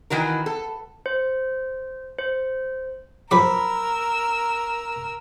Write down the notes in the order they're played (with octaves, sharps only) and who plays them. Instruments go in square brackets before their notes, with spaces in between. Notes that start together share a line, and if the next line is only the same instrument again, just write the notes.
[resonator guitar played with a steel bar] D#3 E3 F#4 A#4
A4
[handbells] C5
C5
[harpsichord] F#2 F3 D6 [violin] A#4 E6 [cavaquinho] B5